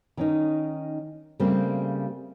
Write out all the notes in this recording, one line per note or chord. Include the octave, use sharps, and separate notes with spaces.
D#3 C#4 D#4
C#3 G3 A3 A#3 C4